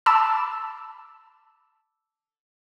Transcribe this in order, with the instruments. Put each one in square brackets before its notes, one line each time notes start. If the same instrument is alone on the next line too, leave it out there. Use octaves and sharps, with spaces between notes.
[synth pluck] A5 B5 D6 E6